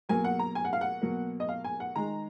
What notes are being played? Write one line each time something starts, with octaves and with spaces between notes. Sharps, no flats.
B2 F#3 A#3 G#5
F#5
A#5
G#5
F#5
F5
F#5
B2 F#3 A#3
D#5
F5
G#5
F#5
D#3 G#3 A#5